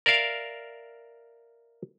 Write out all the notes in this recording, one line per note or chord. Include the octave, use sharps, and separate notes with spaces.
A#4 D5 E5 F5